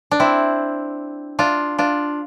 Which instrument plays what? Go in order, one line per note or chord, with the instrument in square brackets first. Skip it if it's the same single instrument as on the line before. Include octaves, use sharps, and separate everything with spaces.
[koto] D4
C4 E4
D4 F4
D4 F4